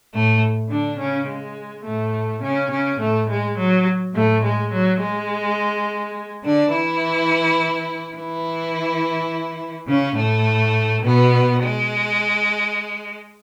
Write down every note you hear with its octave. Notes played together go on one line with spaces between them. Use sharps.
A2 A3
D3 D4
C#3 C#4
G#3
A2 A3
C#3 C#4
C#3 C#4
A2 A3
G#3
F#3
A2 A3
G#3
F#3
G#3
D3 D4
E3 E4
E3 E4
C#3 C#4
A2 A3
B2 B3
G#3